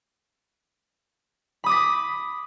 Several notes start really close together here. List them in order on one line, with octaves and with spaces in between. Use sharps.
B5 D#6 D6 B6